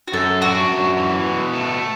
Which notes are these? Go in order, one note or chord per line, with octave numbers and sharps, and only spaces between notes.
F#4
F#2 A4
D4 F#4
F#2
E3
B2
A3